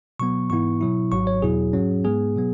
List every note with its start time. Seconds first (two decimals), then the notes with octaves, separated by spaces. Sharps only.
0.20 B2 F#3 B3 C#6
0.50 G#2 E3 B3 E4 C#6
0.81 B2 F#3 E4
1.12 G#1 G#2 F#3 C#6
1.27 C#5
1.42 E2 B2 F#3 E4 G#4
1.73 G#2 F#3 C#4
2.04 G#2 G#3 B3 G#4
2.36 B2 F#3 B3